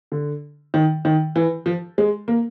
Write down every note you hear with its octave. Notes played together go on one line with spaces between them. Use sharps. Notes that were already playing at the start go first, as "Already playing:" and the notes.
D3
D#3
D#3
E3
F3
G#3
A#3